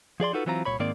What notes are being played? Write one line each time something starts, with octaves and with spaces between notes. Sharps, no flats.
F3 G#4 D5 C6
D#4 F4 F#4 A4 B4
E3 F#3 C4 F4 A#5
C2 G2 A#2 C#5 B5
G#2 D#3 A#3 C4 D5